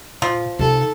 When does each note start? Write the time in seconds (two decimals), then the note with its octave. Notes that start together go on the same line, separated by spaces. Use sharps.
0.22 A#2 F3
0.59 C3 D#4 A4